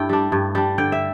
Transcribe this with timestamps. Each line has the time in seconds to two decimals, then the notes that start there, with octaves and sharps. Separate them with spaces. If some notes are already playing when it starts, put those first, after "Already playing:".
Already playing: G2 A3 E4 G5
0.09 G3 D4
0.32 G2
0.55 G3 D4
0.78 D3 G5
0.92 E5